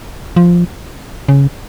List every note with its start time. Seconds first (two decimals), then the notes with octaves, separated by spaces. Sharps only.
0.36 F3
1.29 C#3